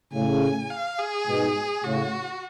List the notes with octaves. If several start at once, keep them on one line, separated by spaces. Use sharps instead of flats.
A2 C#3 G#5
F5
G#4
G#2 B2
A2 C#3 F#4